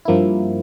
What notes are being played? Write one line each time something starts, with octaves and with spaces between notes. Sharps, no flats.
G2 F3 A#3 E4